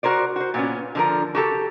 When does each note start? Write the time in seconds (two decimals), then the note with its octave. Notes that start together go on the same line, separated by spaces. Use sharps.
0.03 F#4 G#4 A#4 C5 D5
0.36 F#4 C5
0.54 A#2 B3 C#4
0.95 D3 F3 A#4
1.35 F#4 G4 A4